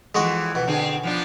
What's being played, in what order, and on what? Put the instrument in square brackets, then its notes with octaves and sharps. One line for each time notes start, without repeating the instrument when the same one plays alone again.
[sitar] F2 C#3 E3 [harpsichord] G#3 F#4 D#5
[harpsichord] B2
[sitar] D3 C4 G#4
F3 B3 D4